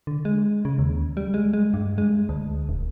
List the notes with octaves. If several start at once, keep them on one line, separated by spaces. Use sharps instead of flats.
D3
G#3
C#3
D#2
G3
G#3
G#3
G2
G#3
D2
D#1